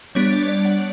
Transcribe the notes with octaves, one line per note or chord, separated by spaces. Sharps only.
G3 B3 D4 C#5
D5
D5
F#5